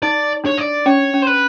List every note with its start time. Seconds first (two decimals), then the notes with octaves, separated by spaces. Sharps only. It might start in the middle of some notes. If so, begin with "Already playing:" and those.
0.02 D#4 D5
0.44 D4 C#5
0.57 D5
0.86 C#4 C#5
1.14 C#4
1.22 C5
1.27 B4